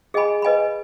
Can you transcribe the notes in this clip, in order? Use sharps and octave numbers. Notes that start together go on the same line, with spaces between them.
G#4 D#5 G#5 B5
B4 D#5 G#5 B5